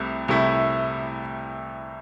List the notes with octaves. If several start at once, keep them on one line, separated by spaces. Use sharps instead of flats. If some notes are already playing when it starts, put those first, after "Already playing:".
Already playing: C2 C3 A3 E4
C2 C3 A3 E4